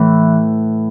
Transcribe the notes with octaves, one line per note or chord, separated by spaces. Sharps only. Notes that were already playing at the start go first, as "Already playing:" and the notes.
Already playing: A2 E3